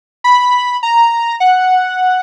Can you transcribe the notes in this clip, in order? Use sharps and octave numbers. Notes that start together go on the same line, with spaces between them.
B5
A#5
F#5